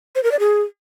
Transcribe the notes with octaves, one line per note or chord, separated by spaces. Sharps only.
C5
A#4
D5
G#4